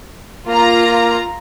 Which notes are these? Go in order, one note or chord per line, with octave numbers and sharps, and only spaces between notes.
A#3 F4 A#5